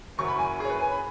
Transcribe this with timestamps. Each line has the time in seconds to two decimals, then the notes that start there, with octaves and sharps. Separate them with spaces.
0.18 F#1 F#2 F#3 C#6
0.28 B5
0.39 G#5
0.60 G#4 C#5
0.70 B4
0.80 G#5
0.92 B5